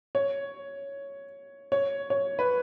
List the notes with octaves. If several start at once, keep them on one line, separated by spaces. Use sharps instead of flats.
C#5
C#5
C#5
B4